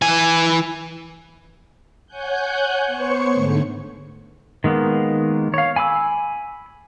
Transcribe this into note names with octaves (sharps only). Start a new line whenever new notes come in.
E3 G#5
C#5 F#5 G#5 F#6 G6
B3 C5 C#5 C#6 C#7
G#2 D3 A3
D#3 G#3 A#3 B3
C#5 F5
G#5 B5 D6 E6